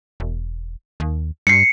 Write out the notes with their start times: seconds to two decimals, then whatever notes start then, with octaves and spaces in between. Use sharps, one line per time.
0.20 E1
1.00 D#2
1.47 G2 C7 C#7